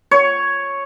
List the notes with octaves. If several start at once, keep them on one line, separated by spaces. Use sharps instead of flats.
C#5